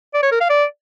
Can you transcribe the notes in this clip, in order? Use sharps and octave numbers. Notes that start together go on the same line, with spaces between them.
D5
C#5
A#4
F5
D5